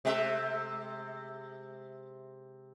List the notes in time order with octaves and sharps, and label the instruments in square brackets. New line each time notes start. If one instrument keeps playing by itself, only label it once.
[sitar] C3 G#3 E5